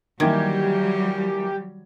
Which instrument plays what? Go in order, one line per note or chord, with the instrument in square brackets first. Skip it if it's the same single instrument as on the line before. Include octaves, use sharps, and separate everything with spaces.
[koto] D#3 [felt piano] E3 A#3 G#6 [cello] F#3 G3 [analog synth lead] G4